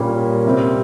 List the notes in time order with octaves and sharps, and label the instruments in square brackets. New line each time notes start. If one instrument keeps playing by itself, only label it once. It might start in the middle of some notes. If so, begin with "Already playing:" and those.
Already playing: [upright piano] A#2 G3 A#3 C#4
C3 G3 C4